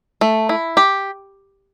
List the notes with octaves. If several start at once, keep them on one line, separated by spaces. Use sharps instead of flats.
A3
E4
G4